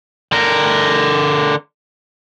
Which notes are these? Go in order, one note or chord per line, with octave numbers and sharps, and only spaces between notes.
D3 A#4